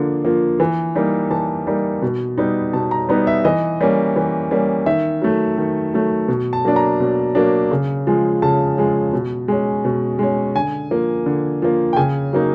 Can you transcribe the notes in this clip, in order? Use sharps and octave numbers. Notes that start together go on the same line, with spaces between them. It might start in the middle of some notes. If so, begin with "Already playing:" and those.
Already playing: D3 F3 A#3
F3 A#3
E3
G3 A#3 D#4
E3 A5
G3 A#3 D#4
B2
G3 B3 D#4
B2 A5
A#5
G3 B3 D#4 A#5
E5
E3 D#5
G3 A#3 C#4
E3
G3 A#3 C#4
D#3 E5
F#3 A3
D#3
F#3 A3
B2
A5
F#3 A#3 D4
A#5
B2
F#3 A#3 D4
C#3
F3 G#3
C#3 A5
F3 G#3
B2
G#3 C#4
B2
G#3 C#4
D3 G#5
F3 A#3
D3
F3 A#3
G5
C#3 G#5
F#3 A#3 D#4